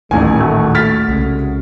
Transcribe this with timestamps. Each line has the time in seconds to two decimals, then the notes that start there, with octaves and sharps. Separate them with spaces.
0.11 D#1 A1 D#2 A2 D#3 G#3 G#5
0.40 A3 F#4
0.75 F6 A6 B6
1.09 C2 C#3 G#3 F#4